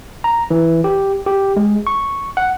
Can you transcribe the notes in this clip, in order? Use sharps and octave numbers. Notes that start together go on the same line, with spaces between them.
A#5
E3
G4
G4
G#3
C#6
F#5